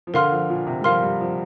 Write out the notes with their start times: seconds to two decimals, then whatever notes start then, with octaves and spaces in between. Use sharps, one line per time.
0.07 F3
0.14 D3 A#4 F5 C6 F6
0.32 F3
0.50 A#2
0.67 C3
0.81 G3
0.84 F3 A#4 F5 C6 F6
1.03 G3
1.20 F3